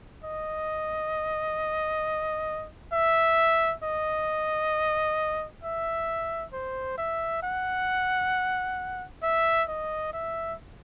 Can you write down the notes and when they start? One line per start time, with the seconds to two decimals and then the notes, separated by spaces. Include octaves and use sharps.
0.24 D#5
2.93 E5
3.84 D#5
5.63 E5
6.53 C5
6.98 E5
7.43 F#5
9.23 E5
9.68 D#5
10.13 E5